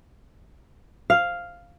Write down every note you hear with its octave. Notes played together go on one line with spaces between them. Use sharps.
F5